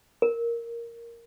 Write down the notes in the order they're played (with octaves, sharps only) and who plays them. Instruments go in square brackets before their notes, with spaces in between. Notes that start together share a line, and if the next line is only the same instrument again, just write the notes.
[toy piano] A#4